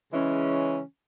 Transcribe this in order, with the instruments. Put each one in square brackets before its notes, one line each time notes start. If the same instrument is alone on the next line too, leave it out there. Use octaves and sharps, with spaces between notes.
[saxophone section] C#3 E3 G#3 C#4